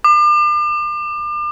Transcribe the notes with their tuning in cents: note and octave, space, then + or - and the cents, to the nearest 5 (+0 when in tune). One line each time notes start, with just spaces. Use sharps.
D6 +35